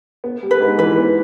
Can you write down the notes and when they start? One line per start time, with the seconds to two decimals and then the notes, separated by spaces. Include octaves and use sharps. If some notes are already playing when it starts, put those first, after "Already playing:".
0.24 B3
0.42 G3
0.51 B4
0.60 G#2
0.78 E3 B4
0.96 B3